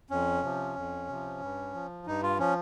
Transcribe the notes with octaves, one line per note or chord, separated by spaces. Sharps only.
F2 C#4
C3 F3
F2
C3 F3
G2
F3
G2 D#4
F4
F3 C#4